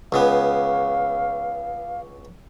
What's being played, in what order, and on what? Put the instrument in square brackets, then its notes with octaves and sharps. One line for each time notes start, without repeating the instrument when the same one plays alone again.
[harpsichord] C#2 C#3 B3 [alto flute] F5